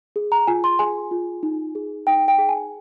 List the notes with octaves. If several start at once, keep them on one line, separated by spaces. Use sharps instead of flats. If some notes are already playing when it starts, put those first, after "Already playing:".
G#4
A#5
F4 G#5
C6
G#4 G#5
F4
D#4
G#4
D#4 G5
G5
G#4
G#5